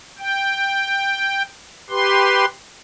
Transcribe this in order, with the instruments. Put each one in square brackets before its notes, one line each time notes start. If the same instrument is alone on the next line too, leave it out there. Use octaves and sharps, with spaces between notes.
[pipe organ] G5
G4 B4 C6